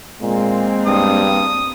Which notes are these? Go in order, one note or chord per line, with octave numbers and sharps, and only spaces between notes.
A#2 G#3 A#3 C4
G2 D#6